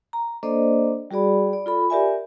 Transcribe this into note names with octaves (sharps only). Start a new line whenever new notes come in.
A#5
A#3 D4 A4 C5 D5 D#5
G3 F#4 G#4 D5 B5
D5
F4 A4 B5
G4 A#4 D5 E5 G#5